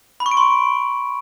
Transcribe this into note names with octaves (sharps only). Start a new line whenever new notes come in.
B5
C#6
D7
C6